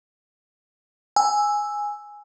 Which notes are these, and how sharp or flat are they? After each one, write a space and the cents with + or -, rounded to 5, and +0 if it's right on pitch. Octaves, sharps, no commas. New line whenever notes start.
G#5 +0 E6 +0